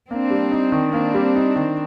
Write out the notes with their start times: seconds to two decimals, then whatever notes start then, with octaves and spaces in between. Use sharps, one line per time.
0.10 A#3 C4 D4
0.30 G3
0.51 D#4
0.72 D#3
0.93 A#3 C4 D4
1.14 G3
1.35 D#4
1.56 D#3